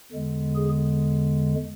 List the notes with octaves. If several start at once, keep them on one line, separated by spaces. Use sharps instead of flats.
E2 D3 G#3
G#4